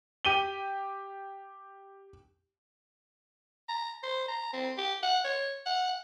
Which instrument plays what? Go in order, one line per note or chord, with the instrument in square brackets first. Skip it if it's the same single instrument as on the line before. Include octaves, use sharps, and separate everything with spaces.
[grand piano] G4 D#7 G7
[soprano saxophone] A#5
C5
A#5
C4
G4
F#5
C#5
F#5